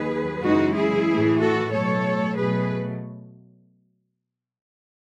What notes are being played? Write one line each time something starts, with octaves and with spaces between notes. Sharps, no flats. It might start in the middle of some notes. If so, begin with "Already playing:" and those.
Already playing: D#2 D#3 F#3 G#4 B4
F#2 C#3 E3 G#3 D#4 F#4
E4 G#4
A2 E3 A3
F#4 A4
B2 F#3 A3 A4 C#5
B2 F#3 A3 G#4 B4